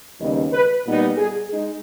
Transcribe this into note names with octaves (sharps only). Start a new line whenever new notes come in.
D#2 C#3 G3 B3 D#4 D#5
B4
A#2 G3 B3 D#4
G#4
G#3 D#4 G#4